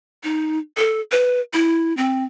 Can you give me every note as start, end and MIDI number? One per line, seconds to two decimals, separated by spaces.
0.23 0.59 63
0.77 1.00 69
1.12 1.40 71
1.53 1.95 64
1.97 2.24 60